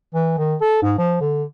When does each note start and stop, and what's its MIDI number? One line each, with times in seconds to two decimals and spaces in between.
0.15 0.37 52
0.38 0.56 51
0.61 0.79 69
0.83 0.94 44
0.98 1.20 53
1.21 1.44 50